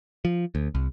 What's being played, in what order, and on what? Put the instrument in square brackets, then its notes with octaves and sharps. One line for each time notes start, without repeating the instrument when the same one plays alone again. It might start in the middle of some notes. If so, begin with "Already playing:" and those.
[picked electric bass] F3
D2
C2